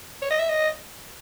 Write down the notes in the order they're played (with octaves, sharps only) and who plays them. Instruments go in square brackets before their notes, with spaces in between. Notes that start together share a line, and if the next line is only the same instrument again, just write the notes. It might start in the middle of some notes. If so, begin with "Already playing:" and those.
[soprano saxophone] C#5
D#5
E5
D#5